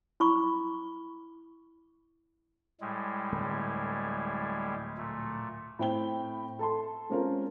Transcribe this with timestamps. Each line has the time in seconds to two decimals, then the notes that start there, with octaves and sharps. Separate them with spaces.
0.20 E4 B5 C#6 D6
2.81 A2 G3 G#3
3.32 D1
4.98 A#2 A3
5.79 A2 C4 G5 B5 G7
6.59 A4 A5 C6
7.10 G#3 C4 C#4 F4 A#4